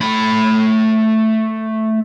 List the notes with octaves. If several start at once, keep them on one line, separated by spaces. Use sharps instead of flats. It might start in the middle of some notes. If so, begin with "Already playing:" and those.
A3 B5